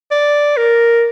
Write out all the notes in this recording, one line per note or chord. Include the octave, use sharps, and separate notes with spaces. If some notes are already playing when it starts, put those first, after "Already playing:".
D5
A#4